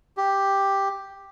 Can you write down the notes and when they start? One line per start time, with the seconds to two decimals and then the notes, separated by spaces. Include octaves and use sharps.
0.17 G4